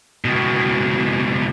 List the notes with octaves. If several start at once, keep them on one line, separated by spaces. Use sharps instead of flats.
C#2 B2